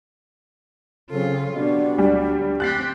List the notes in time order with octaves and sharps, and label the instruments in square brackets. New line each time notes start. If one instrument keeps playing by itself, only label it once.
[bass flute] C#3 [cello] F#3 F4 [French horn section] C4 A4
[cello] B2 [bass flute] D4 [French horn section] F#4 G4 D5
[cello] D2 F#3 [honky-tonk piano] G3
[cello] C4 G4 [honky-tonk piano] F#6 A6 C7